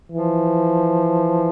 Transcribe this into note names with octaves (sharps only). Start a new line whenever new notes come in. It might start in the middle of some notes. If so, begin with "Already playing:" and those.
E3 F3